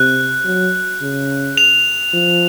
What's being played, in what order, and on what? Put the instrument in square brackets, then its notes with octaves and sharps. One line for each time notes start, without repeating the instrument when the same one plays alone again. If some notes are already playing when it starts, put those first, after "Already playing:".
Already playing: [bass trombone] C3 [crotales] F#6
[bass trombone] F#3
C#3
[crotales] F7
[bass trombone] F3